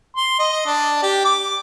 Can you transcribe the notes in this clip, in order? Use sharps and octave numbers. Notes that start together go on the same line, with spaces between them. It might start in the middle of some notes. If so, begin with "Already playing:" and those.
C6
D#5
D4
G4
D6